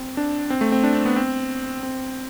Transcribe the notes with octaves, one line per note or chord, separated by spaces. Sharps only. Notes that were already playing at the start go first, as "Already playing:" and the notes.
Already playing: C4
D4
C4
A3
C4
D4
C4
B3
C4
C4